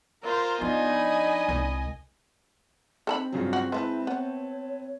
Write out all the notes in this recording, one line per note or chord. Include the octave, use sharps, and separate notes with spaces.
F4 A#4 C5
F3 B3 D4 D#4 F4 D#5 G#5
B5
C2 G#3
C4 D#4 A4 A5 B5
G2 C#3 F#3 F4
F#4
G#3 E4 B4 E5 A5
B3 C#5